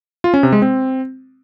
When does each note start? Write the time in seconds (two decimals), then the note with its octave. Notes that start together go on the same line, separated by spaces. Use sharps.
0.24 F4
0.34 C#4
0.43 C3
0.52 G#3
0.62 C4